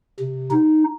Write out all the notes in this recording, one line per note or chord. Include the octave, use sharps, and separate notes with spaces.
C3
D#4